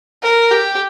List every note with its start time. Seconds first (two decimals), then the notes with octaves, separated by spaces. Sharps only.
0.23 A#4
0.52 G4